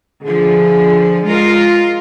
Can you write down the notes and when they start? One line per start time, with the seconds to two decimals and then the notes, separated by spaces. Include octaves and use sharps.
0.24 D3 F3 G#4
1.25 G#3 F4 A#4